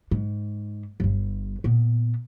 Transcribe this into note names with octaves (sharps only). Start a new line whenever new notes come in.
G#2
G1 G2
A#2 B3